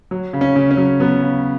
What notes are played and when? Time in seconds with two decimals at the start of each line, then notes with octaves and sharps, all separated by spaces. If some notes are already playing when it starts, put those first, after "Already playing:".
0.11 F#3
0.33 C#3
0.41 C#4
0.56 C#3
0.71 C#4
0.77 F#3
1.00 F#3 B3
1.22 C#3